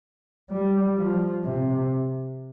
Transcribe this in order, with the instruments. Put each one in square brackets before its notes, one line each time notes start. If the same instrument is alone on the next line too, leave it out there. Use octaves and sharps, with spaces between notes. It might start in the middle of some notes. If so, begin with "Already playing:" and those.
[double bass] G3
F3
C3